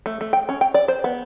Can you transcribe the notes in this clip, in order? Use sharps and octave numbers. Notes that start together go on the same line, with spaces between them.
A3
A3
G5
C#4
G5
D5
C5
B3